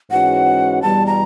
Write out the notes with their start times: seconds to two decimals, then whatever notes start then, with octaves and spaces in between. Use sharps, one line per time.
0.10 G#2 E3 G#3 C#4 F#4 F#5
0.82 E2 B2 G3 A5
1.06 A#5